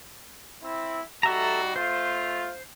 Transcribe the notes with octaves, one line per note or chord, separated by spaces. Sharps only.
C4 E4
G3 D#4 F#4 A4 E5 A#5
A3 F4 C5